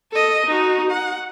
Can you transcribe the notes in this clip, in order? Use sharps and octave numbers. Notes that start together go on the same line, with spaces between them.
A4 D#5
D#4 F#4
F#5